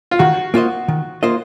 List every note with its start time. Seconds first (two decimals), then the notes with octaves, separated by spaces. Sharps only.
0.11 F4
0.19 D#3 F#4
0.54 A#3 F4 C5 D#5
0.88 D#3
1.23 A#3 F4 C5 D#5